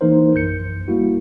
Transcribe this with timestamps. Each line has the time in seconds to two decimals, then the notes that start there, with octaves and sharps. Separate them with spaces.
0.01 E3 A#3 D#4 A#4 C5
0.34 A#1 F#2 G6 C#7
0.88 G3 A#3 E4 F#4